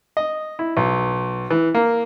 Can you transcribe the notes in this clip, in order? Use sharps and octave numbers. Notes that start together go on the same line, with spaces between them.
D#5
E4
B1
E3
A#3